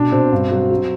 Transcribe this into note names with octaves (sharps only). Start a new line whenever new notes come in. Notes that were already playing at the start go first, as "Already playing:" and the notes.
Already playing: B2 D4
B2 C4
G2
F#3
F#3